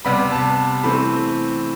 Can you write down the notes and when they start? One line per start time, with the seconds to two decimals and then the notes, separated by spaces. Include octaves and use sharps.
0.05 C3 G3 B3 B5
0.32 A5
0.84 E3 A3 C4 B5